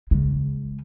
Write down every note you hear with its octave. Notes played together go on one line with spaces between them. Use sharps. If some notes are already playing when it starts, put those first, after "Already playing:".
C#3 G#3